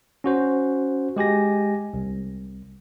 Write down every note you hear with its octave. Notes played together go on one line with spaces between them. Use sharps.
C#4 F#4 C5
G#3 G4 G#5 A#6
C2